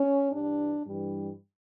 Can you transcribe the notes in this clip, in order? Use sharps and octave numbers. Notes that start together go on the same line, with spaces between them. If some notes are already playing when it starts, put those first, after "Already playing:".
Already playing: C#4
G2 E3 G3 D4
G2 E3 G3